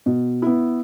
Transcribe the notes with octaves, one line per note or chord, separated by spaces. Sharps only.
B2
B3 E4